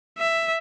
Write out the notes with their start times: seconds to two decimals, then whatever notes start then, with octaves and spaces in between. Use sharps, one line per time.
0.18 E5